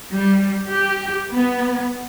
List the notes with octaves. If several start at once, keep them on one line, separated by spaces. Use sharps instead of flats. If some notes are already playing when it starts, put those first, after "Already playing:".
G3
G4
B3